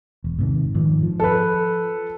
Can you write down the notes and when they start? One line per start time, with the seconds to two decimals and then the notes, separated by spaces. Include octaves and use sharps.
0.24 E1
0.38 G#2 C3 D#3
0.74 G#2 D#3 F3
1.03 F3
1.20 A4 B4